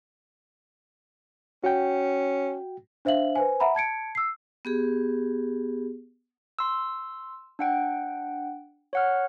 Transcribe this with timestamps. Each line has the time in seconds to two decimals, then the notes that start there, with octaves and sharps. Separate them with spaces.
1.64 C#4 F#4 G5
3.05 D4 C5 E5 F5 F#7
3.35 B4 C5 G#5
3.60 E5 F#5 A#5 B5
3.75 A5 G#6 C#7 D7
4.15 E6 C7
4.65 B3 G4 G#4
6.59 C6 E6
7.59 D4 F#5 G5
8.93 C#5 F#5 F6